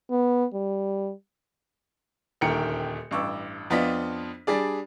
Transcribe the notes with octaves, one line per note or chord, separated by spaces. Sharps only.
B3
G3
D#1 D2 D#3 A#4 G5 C#7
A1 G2 C#6 D6 E6
F2 B3 D4 F4 D#5 B6
G3 D4 G#4 D5